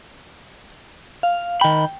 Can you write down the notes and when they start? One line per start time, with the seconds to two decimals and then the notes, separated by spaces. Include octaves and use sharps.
1.23 F5
1.61 D#3 G5 B5